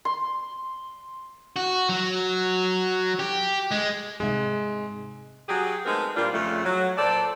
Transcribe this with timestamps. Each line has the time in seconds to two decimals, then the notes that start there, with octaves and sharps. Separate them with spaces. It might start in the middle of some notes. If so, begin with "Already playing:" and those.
0.05 C6
1.56 F#4
1.89 F#3
3.19 G4
3.71 G#3
4.20 G#2 C3 G#3 E5
5.48 F#3 G4 G#4
5.86 G#3 A3 B3 C4 D#4 A#4
6.16 A#2 G3 A#3 D4 F4
6.33 F2 C#3 A3
6.65 F#3
6.98 A#2 A4 C5 D5